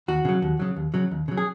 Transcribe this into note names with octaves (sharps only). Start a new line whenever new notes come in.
D#2 F#4
C#3 F#3
D#2
C#3 F#3
D#2
C#3 F#3
D#2
C#3 F#3
G#4